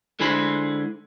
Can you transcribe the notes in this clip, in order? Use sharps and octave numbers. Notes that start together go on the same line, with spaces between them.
D3 G#3 E4 G#4 C5 B5